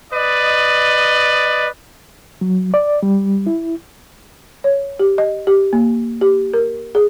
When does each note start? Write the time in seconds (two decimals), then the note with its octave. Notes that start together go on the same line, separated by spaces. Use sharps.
0.13 B4 D5 D#5
2.41 F#3
2.74 D5
3.03 G3
3.46 E4
4.64 C#5
5.00 G4
5.18 D#5
5.47 G4
5.73 A#3
6.21 G4
6.54 A#4
6.95 G#4